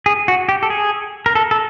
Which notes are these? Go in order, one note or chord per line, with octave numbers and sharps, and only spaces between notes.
G#4
F#4
G4
A4
G#4
A#4
A4
A4